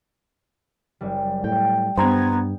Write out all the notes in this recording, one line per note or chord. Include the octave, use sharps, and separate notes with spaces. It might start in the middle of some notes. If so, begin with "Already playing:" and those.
F#1 G3
A2 G5
G2 B3 C5 A#5 G#6